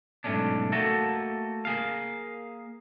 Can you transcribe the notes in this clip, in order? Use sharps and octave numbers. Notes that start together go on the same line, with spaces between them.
B1 G#2 B2 A3 C#4 D4
A3 A#3 F#4 A4
A#3 G#4 F5